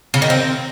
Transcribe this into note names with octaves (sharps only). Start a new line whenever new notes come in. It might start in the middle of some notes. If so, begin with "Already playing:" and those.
C#3
D#3
C4